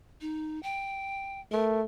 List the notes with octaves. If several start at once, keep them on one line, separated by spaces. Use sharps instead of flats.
D#4
G5
A3 A#4